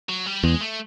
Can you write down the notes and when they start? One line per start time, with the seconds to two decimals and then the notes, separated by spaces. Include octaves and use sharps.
0.09 F#3
0.26 G3
0.44 E2 G#3
0.61 A3